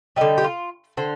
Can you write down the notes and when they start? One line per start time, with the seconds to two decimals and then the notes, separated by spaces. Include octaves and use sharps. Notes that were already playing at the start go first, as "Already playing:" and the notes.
0.16 D3 G3 D#4
0.38 G4
0.44 F4
0.97 D3 C5